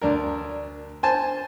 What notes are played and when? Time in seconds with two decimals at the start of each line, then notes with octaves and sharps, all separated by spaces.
0.02 D2 D4 A#4
1.03 C5 G#5 A5